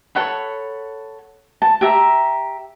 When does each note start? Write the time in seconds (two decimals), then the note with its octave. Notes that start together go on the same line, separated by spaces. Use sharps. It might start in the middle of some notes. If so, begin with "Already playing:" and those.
0.15 A4 C#5 F#5 B5
1.62 A5
1.81 G4 E5 A#5